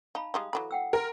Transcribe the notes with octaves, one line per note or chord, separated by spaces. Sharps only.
D#4 F5 A5 B5
G3 G#3 D#4 F5 D#6
E3 F#3 A4 B5
F#5 G5 E6
A#4 C6